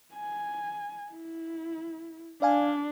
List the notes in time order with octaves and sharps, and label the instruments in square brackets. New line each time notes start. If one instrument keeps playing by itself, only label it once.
[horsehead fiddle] G#5
E4
[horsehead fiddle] D4 [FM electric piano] D5 F5 G#5